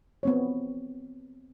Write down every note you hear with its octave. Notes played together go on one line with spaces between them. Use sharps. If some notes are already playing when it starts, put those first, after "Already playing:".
B3 C4 C#5